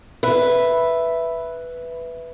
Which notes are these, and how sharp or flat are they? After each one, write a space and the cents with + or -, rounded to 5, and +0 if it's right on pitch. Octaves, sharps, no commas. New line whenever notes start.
B4 +0 E5 +0